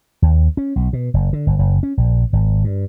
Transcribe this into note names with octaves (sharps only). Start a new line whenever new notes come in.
D#2
C#4
B1
B2
F#1
D3
G1
F#1
C#4
A#1
G#1
G2